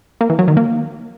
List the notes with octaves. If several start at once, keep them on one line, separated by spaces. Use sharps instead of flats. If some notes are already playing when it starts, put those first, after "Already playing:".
A#3
E3
F#3
D#3
A#3